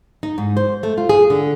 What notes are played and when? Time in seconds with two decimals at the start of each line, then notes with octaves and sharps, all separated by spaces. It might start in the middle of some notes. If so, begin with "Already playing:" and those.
0.23 D#4
0.38 G#2
0.57 C5
0.83 A3
0.98 F4
1.09 G#4
1.30 D3